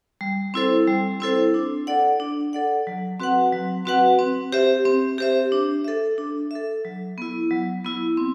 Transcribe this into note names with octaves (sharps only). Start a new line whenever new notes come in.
G3
C4 E4 A4 C5
G3
C4 E4 A4 C5
D4
A4 D5 F#5
D4
A4 D5 F#5
F#3
C4 F#4 B4 F#5
F#3
C4 F#4 B4 F#5
C4
G4 C5 E5
C4
G4 C5 E5
D4
A4 E5
D4
A4 E5
F#3
B3 E4
F#3
B3 E4
C4